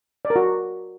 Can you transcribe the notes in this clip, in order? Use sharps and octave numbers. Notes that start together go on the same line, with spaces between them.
D5
A#4
F#4